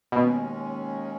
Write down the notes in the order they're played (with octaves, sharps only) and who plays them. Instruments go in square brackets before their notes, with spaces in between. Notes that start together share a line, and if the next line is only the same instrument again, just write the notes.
[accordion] D#2 D#3 G#3 C#4 [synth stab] B2